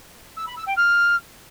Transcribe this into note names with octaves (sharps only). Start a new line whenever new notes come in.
E6
B5
E6
G5
F6